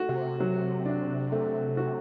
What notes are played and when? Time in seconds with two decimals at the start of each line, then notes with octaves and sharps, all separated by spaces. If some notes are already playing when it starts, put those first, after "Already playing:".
Already playing: A3 F#4
0.09 C3
0.40 F#3
0.85 D4
1.32 A3
1.77 F#4